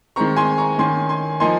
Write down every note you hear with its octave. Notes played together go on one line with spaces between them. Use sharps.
D#3 G#3 C4 A#5 C#6
G#5 C6
A#5 C#6
D#3 A#3 C#4 G#5 C6
G#5 C6
F3 A#3 D#4 G#5 C6